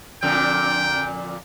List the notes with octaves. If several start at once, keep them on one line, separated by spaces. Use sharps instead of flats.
F2 A#2 D3 G5